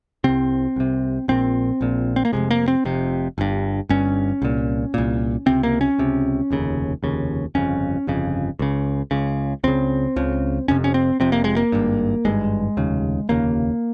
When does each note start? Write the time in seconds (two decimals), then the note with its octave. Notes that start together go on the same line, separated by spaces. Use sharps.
0.24 C2 C3 C4
0.76 C2 C3
1.28 A#1 A#2 C4
1.81 A#1 A#2
2.16 C4
2.25 A#3
2.33 F1 F2 C3 G#3
2.51 A#3
2.68 C4
2.85 F1 F2 C3
3.38 G1 G2
3.89 G1 G2 C#4
4.42 C2 A#2
4.94 C2 A#2
5.46 C#2 C3 C4
5.63 A#3
5.81 C#4
5.98 C#2 C3
6.50 F1 D#2 C#3
7.03 F1 D#2 C#3
7.55 G1 F2 C#3 C#4
8.07 G1 F2 C#3
8.59 C#2 C#3
9.11 C#2 C#3
9.64 C#2 C#3 C4
10.16 C#2 C#3
10.68 F1 F2 C3 C#4
10.84 C#4
10.94 C4
11.20 F1 F2 C3 C4
11.32 A#3
11.44 G#3
11.56 A#3
11.72 G#1 G2
12.25 G#1 G2 G#3
12.77 F1 D#2 C#3
13.29 F1 D#2 C#3 A#3